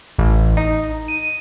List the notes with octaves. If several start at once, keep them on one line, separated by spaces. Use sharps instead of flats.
A1
D#4
D#7